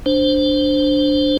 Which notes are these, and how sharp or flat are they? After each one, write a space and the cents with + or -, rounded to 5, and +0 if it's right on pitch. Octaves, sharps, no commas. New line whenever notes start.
D4 +0 C5 +0